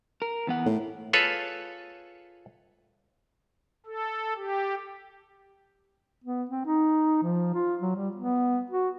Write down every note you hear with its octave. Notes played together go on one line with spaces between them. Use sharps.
A#4
E2 B3 F#5
A2
F4 G#4 A4 B4 C#5
A4
G4
B3
C4
D#4
F3
F4
F#3
G3
B3
F#4